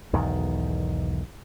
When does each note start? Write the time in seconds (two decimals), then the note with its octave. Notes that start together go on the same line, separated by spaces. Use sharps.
0.13 B1 E2 G#2 D#3